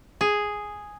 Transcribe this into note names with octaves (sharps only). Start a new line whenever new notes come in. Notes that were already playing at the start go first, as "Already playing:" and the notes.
G#4